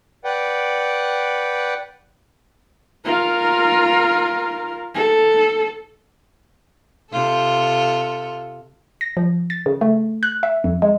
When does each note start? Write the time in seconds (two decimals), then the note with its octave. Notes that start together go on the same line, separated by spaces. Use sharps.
0.24 B4 D5 F#5 G5
3.05 F4 A#4
4.95 A4
7.12 C3 F4 A4
9.01 A#6
9.17 F3
9.50 A6
9.66 C#3
9.81 A3
10.23 F#6
10.43 E5
10.64 F2
10.82 G#3